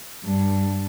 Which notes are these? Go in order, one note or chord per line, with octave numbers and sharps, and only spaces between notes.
G2